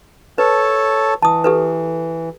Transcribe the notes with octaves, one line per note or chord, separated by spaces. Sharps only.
A4 B4 C#5 A5
E3 A5 D#6
G4 A4 B4